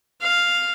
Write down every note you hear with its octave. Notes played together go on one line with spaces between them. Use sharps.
F5